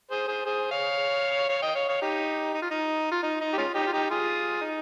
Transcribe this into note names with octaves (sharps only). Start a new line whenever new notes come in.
G#4 C5
G#4 C5
G#4 C5
C#5 F5
C#5 F5
D#5 G5
C#5 F5
C#5 F5
D#4 G4
D#4
F4
D#4
F4
D#4
D#4
G4
G#3 C#4 F4
D#4 G4
F4
D#4 G4
F4 G#4
D#4